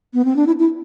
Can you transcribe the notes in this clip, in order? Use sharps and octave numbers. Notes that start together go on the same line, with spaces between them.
B3
C4
D4
E4
E4